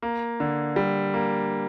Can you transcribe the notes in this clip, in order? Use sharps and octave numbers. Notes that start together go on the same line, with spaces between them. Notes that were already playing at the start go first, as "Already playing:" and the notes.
A#3
D3
G3
A#3